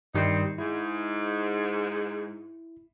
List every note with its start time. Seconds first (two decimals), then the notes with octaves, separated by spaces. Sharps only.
0.15 G2 D#3 G3 C4 D#4
0.58 G#2 E4